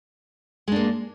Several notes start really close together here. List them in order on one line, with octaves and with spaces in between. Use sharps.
G#3 D4 A#3